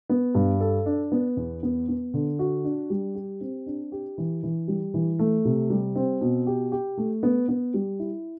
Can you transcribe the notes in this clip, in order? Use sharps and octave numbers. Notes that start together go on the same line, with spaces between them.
B3
G2
A4
D4
B3
E2
B3
B3
D3
F#4
D4
G3
G4
C4
D4
G4
E3
E3
G3
E3
A3
C3
G3
C4
B2
G4
G4
A3
B3
B3
G3
E4